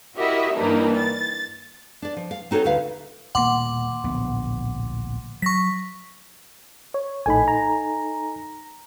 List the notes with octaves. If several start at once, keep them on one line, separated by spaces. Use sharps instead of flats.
E4 F#4 G4 A#4 D#5 E5
G2 D#3 E3 A#3 D4 D#4
A6
D4 D5
F3
F5
C4 D#4 F#4 A4 C#5
D2 D3 F#4 B4 F5
D#1 B2 A#3 F#5 C6 D6
D1 A#1 B3
F#3 C#6 A#6 B6
C#5
A#1 A2 D#4 A4 G#5 B5
A#5